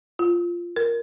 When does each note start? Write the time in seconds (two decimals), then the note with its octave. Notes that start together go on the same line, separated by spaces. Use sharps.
0.19 F4
0.76 A#4